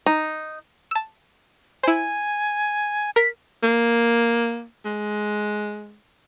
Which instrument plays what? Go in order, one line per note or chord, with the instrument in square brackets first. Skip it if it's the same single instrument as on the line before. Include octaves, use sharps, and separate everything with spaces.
[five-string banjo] D#4
[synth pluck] A5 E6
[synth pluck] E4 C5 [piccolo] G#5
[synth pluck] A#4 [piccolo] B6
[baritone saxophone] A#3
G#3